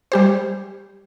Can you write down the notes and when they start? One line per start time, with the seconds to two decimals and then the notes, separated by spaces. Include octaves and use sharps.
0.12 G3 G4 C5